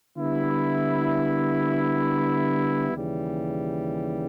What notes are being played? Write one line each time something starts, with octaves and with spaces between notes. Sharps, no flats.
D3 G3 B3 E4
D#2 C#3 E3 G3